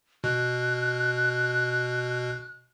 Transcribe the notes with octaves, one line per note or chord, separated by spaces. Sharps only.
B2 F#6